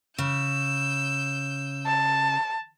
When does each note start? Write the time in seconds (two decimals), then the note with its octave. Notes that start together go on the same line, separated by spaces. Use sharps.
0.18 C#3 E6 G6
1.86 A5